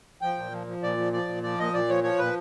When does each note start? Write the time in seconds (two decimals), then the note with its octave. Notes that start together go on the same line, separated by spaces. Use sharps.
0.21 F3 G5
0.37 A#2
0.52 F3
0.67 F3
0.82 A#2 D5
0.97 F3
1.13 F3 D5
1.28 A#2
1.43 F3 D5
1.59 A#2 D#5
1.74 A#2 D5
1.89 F3 C#5
2.03 F3 C#5
2.19 A#2 B4